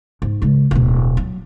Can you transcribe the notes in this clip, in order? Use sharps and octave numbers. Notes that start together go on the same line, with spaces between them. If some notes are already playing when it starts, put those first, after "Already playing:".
G#2
C#3 G#3
D1 B2
F#3